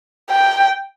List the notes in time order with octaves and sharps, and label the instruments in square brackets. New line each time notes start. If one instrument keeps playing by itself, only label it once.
[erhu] G5